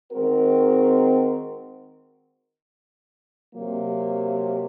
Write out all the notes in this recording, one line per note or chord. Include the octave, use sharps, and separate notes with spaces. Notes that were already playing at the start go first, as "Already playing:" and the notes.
D#3 G#3 C4 F#4 A#4
C3 F#3 A#3